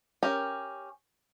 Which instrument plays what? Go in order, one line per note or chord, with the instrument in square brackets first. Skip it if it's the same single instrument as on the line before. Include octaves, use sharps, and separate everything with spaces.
[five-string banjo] C#4 G4 A#4